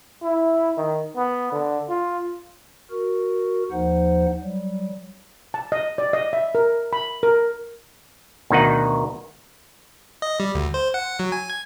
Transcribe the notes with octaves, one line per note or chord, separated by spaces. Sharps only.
E4
D#3
B3
D3
F4
F#4 A#4
D#2 F3 D#4 C5 F#5
F#3 G3
A5
D#5
D5
D#5
E5
A#4
B5
A#4
D2 B2 D#3 D#4 F#5
D#5
G3
D2
C5
F#5
F#3
G#5
G#6